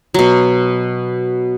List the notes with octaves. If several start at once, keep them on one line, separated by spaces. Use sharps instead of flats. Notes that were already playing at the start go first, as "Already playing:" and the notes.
B2 F#3